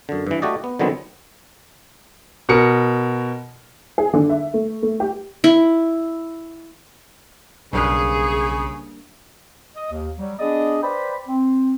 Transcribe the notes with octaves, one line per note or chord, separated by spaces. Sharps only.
F#2 D3
G2 E3
A3 F#4 G4 D5 D#5
B3
D3 D#3 F#3 B3 C4
B2 A#4 C#7
G#4
D3
E5
A3
A3
G4
E4
B1 G2 C#3 A#3 G#4 B4
D#5
D#2
F#3 G3
B3 D4 G#4 D5 D#5
B4 C5 D5 G5 B5
C4